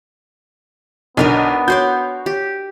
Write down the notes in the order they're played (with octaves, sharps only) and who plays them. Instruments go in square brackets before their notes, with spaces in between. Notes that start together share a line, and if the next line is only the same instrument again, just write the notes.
[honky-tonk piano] B1 D3 [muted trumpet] B3 [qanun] D4 A#4 G#5
[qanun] F#4 C6 D6 [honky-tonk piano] C#5 G6
[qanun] G4